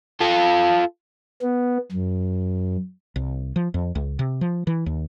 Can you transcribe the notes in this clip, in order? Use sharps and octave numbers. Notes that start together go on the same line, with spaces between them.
F4 A4
B3
F#2
C2
F3
F2
C#2
C3
F3
E3
D#2